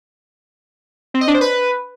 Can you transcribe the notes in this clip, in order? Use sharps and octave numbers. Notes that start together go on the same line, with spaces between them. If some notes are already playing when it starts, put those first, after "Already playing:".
C4
D#5
D4
C5
B4